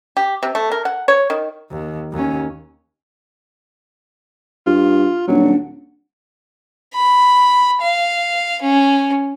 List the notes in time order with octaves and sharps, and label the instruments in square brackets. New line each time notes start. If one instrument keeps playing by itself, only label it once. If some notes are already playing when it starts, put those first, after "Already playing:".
[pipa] G4
C3
A3
A#4
F#5
C#5
D#3
[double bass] D#2
D#2 C#4
[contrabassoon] G2 [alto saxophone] F4
[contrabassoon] D#1 [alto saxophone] F#3 [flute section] D4 F#5
[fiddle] B5
F5
C#4